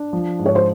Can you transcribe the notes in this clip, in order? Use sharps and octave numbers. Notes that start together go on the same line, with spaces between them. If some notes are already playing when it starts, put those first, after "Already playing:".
Already playing: D4
F3
G#2
C#5
C5